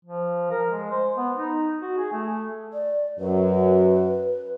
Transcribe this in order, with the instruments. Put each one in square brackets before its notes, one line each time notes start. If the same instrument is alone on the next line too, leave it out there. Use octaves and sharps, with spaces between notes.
[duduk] F3
A#4
G#3
C5
B3
D#4
F#4
G#4
A3
[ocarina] D5
[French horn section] F#2 [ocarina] B4